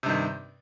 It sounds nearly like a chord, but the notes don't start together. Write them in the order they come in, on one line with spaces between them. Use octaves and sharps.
C3 G2 D#3